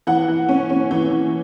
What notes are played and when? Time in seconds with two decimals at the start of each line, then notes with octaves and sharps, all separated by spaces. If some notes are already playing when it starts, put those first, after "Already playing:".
0.07 E3 F#5
0.28 E3
0.49 C#4
0.70 C#4
0.91 E3
1.11 E3